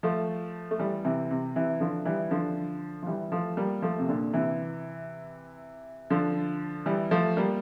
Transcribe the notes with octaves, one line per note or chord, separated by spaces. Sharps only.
F3 A3
A3
E3 G3
C3 E3
C3
C3 E3
D3 F3
E3 G3
D3 F3
F3
E3 G3
F3 A3
G3 A#3
F3 A3
C3
A#2 D3
C3 E3
D3 F3
E3 G3
F3 A3
G3 A#3